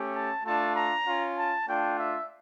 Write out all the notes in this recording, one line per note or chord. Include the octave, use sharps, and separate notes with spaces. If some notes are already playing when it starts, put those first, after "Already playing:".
Already playing: A3 C#4 G4
A5
A3 D4 F4 A5
A#5
C#4 F4
A5
A3 D4 F4 G5
E5